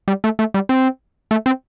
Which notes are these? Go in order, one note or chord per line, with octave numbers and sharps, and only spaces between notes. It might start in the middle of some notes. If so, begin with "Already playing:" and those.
G3
A3
A3
G3
C4
A3
C4